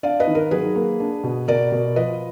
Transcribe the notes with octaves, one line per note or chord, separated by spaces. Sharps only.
D4 D5 F5
B4 D#5
D#3
A#4
F#3 G#4 B4
A#3
D4
B2
B2 A#4 D5
B2
F3 B4 D#5